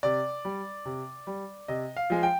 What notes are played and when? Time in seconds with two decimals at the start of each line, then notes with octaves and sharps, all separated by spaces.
0.03 C3 D5
0.45 G3
0.86 C3
1.27 G3
1.68 C3 D#5
1.96 F5
2.10 F3 G#3
2.23 G5